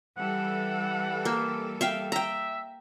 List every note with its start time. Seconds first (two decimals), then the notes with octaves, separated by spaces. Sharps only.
0.17 E3 G3 A4 F#5
1.25 A#3
1.81 E5 F5 G5
2.12 E5 G5 A#5